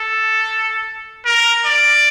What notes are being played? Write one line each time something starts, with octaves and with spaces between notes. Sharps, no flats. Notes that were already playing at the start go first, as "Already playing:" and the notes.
Already playing: A4
A#4
D5